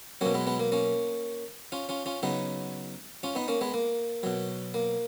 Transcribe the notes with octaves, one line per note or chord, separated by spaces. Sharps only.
B2 F#3 A#3 C#4
G#3 B3
G#3 B3
A#3
A#3 C#4
C#4 F4
C#4 F4
C#4 F4
C#3 F#3 B3 D#4
C#4 F4
B3 D#4
A#3 C#4
G#3 B3
A#3
B2 F#3
A#3